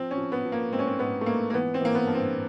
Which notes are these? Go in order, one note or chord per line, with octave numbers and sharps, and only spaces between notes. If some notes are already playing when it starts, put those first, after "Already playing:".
Already playing: F3 C4
C#4
F3
B3
F3
A#3
G#2 C4
C#4
C4
G#2 B3
A3
G#2 A#3
A#3
E3 B3
C4
E3 A#3
B3
G2
C4